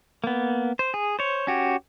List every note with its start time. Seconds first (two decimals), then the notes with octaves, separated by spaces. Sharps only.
0.24 A#3 B3
0.79 C5
0.94 G#4
1.19 C5 C#5
1.47 C#4 F#4 G4